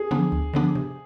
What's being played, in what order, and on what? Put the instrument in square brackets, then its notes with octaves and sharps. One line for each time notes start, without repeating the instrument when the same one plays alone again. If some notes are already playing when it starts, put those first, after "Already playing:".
Already playing: [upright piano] G#4
[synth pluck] D3 F3 B3 D4
D2
D3 F3 B3 D4
C3